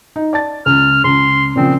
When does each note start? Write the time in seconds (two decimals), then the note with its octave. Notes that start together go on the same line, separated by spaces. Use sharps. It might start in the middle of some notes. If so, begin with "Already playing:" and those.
0.16 D#4
0.33 D5 A5 A6
0.66 C#2 F6
1.04 C#2 C6
1.56 A#2 C#3 F3 C4